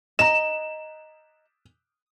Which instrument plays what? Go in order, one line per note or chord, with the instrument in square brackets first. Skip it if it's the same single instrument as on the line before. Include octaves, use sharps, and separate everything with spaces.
[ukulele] D#5 A#5 [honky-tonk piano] E7